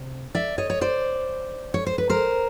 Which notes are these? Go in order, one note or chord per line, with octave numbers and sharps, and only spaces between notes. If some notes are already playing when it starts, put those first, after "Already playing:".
Already playing: C3
D5 E5
C#5 D#5
C#5
C5 D5
C#5
C5
B4
A#4 C5